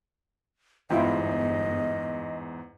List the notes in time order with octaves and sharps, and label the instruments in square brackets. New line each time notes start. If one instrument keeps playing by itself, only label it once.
[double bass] G1 [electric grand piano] E2 G#2 [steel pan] E4 F4 G5 [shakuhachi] D#5